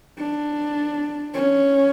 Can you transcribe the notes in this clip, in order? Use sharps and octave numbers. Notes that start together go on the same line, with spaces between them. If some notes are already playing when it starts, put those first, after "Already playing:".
D4
C#4